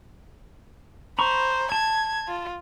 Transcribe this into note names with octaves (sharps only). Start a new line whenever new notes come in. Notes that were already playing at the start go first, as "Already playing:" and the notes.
C5 A#5 B5 C#6
A5 G#6
F4